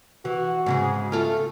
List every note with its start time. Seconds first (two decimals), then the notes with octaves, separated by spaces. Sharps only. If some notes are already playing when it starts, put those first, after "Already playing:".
0.25 E3 F#4
0.66 G#2 C#3 G#3
1.12 A3 F4 A4